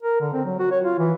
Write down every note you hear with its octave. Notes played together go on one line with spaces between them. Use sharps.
A#4
D3
C4
F#3
F#4
C#5
F4
E3